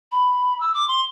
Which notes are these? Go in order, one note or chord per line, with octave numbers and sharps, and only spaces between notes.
B5
E6
D6
C6